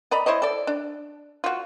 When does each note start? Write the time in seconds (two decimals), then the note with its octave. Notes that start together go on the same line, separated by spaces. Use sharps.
0.11 D5 D#5 A#5 B5
0.26 E4 C5 C#5 D#5
0.42 A4 D5
0.67 D4
1.44 F4 F#4